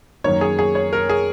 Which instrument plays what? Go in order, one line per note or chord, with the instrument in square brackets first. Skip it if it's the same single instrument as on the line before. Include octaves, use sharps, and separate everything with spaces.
[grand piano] F#2 D#3 A#3 C#5
G#4
G#4
C#5
A#4
G#4